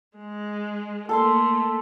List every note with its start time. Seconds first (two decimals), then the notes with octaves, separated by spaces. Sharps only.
0.18 G#3
1.09 A3 A#3 A4 A5 C6